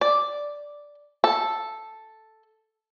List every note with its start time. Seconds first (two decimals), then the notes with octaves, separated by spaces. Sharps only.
0.01 D5
1.24 A4